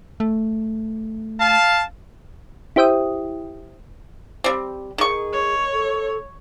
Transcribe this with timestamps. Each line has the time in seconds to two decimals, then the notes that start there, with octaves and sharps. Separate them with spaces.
0.20 A3
1.40 F5 A5
2.76 E4 G4 C5 E5 G5 D#6
4.44 G3 C4
4.98 D#3 G#4 C#6
5.32 C#5
5.72 A4